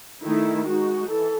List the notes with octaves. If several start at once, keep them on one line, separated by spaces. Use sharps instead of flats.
D#3 A3 D#4 E4
G#3 D#4 F#4
E3 A4